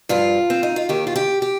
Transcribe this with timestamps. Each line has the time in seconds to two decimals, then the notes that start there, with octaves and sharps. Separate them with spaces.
0.09 G2 F3 F4
0.50 C4
0.63 D#4
0.76 F4
0.89 D#2 D#3 G4
1.07 F4
1.16 G4
1.42 G4